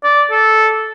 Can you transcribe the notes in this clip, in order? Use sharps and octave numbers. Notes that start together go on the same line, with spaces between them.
D5
A4